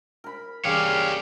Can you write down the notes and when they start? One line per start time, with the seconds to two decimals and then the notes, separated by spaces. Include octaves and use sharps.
0.24 A#4 B5
0.65 C#3 G3 G4 C#5 F5